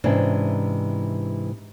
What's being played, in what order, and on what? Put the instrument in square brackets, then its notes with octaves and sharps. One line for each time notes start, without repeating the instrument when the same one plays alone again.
[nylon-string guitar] G#2 C3 E3 C#4 D4